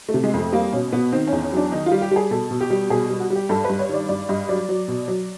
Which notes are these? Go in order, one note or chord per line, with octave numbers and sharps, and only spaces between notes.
A3
C3
G#3
F2 A3
G3 A#3
B2 C#4
B2 B3
D#3 C4
E2 C#4
C#4
F#3 D4
D#3 D#4
F4
G3
G4
G3 G#4
B2 A4
B2
G4
G3
B2 G#4
G3
F#4
G3
G4
G2 A4
G2 B4
C#5
D#3 D5
G2 D5
G2 D#5
F#3 D5
F#3
B2
F#3